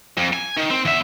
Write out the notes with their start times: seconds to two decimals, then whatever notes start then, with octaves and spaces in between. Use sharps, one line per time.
0.17 F2
0.33 G#5
0.57 D#3
0.70 C4
0.85 E2 E5